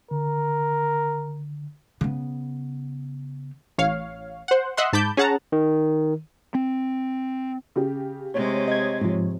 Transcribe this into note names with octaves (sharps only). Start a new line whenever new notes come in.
D3 A#4
C#3 B3
A1 C#5 F5
C5 F#5
D#5 E5 F#5 C6
G#2 A5 B5 D6 G6
C#4 G#4 F#5 A5 A#5
D#3
C4
C#3 G4
C3 G#3 C#5
D#5 G#6
G#2 F3